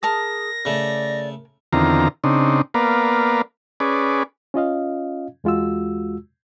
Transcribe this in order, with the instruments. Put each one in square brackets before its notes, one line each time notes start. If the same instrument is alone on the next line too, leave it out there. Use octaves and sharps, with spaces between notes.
[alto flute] G#4 [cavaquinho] A#4 A5 D#6 [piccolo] A#6
[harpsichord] C#3 A3 [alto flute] D5
[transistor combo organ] E2 D3 D#3 C4 F4 A#5
C#3 C4 D4 D#4
A#3 B3 A#4 B4 D5 F5
C#4 G#4 B4 D5
[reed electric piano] C#4 F4 D#5 F5
E2 G#3 F4 F#4 E6